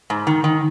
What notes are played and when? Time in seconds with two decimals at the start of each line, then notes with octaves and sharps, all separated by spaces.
0.10 G#2
0.27 D#3
0.44 D#3